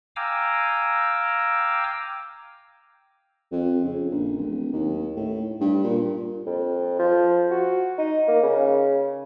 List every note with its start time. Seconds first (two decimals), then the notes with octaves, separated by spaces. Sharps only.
0.16 F5 G5 G#5 A#5 D6 E6
3.52 F2
3.84 C#3
4.11 A#1
4.38 D1
4.72 D#2
5.16 A2
5.60 G2
5.84 A#2
6.46 F2
6.99 F3
7.51 F#4
7.98 D#4
8.28 A#3
8.43 C#3